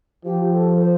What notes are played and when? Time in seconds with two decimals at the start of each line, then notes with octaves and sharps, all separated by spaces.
0.25 F3 G4
0.53 A4
0.76 A#4
0.79 C5